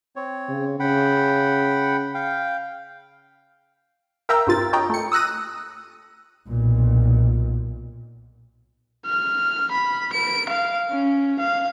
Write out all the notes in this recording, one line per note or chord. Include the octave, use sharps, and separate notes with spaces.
C4 C#5
C#3
C#3 F#5 G5 B5
F5 G5
A#4 E5 F5 G5 A#5 E6
G2 C3 F4 A6
C#5 D#5 G5 A#5
A3 C#7
D#6 E6 F#6 A#6 D#7
B1 A#2
F6
B5
D7
F5
C#4
F5